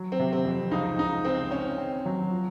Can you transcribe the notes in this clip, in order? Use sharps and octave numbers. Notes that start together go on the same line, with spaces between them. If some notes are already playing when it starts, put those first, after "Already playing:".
Already playing: F#3
C4
C3
C4
F2
C#2 D#4
C#2 D#4
C#2 C4
C4 C#4
C4
F#3
F3